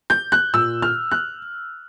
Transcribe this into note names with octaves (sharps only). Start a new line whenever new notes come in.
G6
F#6
A#2 E6
F6
F#6